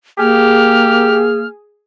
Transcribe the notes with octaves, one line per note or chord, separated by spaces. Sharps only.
A#3 G4 G#4 F6